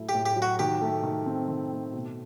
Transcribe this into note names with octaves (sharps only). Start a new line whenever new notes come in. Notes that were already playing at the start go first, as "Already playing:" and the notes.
Already playing: A2 F#3 A3 E4
G4
A2
G4
F#3
F#4
D#3 G4
A3
D#3
C4
D#3
A3
B2